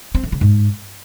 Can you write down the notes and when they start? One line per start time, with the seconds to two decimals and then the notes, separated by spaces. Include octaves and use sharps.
0.15 C4
0.23 D3
0.32 C#3
0.41 G#2